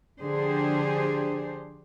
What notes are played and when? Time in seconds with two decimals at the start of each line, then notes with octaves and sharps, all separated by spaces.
0.21 D3 F3 D4 G4 G#4 C5